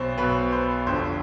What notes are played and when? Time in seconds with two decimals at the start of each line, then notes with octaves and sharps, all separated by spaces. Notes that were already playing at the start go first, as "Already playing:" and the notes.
Already playing: B1 B2 C5
0.18 B1 B2 B4
0.52 C5
0.86 F1 F2 D3 F3 C5